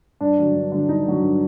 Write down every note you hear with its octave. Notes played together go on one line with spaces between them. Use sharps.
G2 D4
D3 F#3
G2
D3 F#3
G2 D#4
D3 F#3
G2